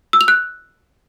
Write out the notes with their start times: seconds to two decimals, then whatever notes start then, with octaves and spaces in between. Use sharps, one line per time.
0.13 E6
0.21 F7
0.28 F#6